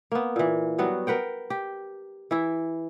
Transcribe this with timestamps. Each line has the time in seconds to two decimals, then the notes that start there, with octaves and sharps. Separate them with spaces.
0.12 A#3 B3
0.36 A#2 E3
0.79 F#3 G3 B3 F#4
1.07 A#4 B4 F#5 G5
1.50 G4
2.31 E3 E4